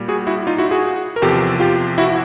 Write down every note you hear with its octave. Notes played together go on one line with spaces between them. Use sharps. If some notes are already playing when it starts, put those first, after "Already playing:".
Already playing: A#2 G3
F#4 G#4
E4 F#4
D#4 F4
E4 F#4
F#4 G#4
A#4
E2 C3 F3 G4 A4
F4 G4
E4 F#4